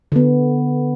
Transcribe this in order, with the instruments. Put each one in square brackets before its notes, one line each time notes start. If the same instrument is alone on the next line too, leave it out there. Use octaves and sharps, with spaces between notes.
[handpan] D3 B3